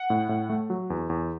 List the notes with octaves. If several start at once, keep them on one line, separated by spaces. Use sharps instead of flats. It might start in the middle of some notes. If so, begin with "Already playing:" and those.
Already playing: F#5
A2
A2
A3
F#3
E2
E2